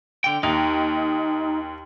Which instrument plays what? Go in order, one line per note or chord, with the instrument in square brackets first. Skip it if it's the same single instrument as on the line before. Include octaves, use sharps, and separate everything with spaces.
[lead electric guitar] D3 G5
[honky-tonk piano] D#2 [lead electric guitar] D#4